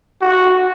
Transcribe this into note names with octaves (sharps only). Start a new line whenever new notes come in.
F#4